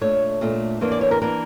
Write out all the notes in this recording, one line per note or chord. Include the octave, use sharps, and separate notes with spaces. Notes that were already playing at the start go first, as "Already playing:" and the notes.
A#2 A3 D4 C#5
A#2 A3 D4
E2 E3 A#3 D4
D5
C#5
A#4
E3 A#3 D4 A#4